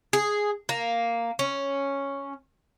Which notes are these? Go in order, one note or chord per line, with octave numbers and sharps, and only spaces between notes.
G#4
A#3
C#4